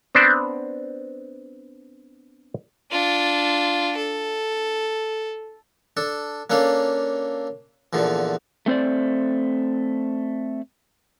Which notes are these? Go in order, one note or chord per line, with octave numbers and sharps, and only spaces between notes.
B3 C4 D4 C5 D5 A5
D4 F4
A4
D4 A4
A#3 C#4 D4 A4 F5
E2 A#2 D3 F3
A3 C4 C5 D5